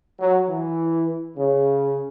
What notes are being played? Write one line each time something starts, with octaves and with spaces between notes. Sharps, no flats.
F#3
E3
C#3